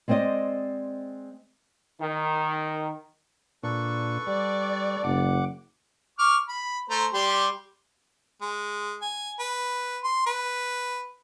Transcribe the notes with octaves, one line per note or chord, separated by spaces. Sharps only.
G#3 C4 C5 D5 D#5
D#3
A#2 D4 A4 B4 C#6
G3 D5
F#1 F#5 D6
C#6 D6 F6
B5
A3 C5 A#5
G3 G4 C6
G#3
G#5
B4
C6
B4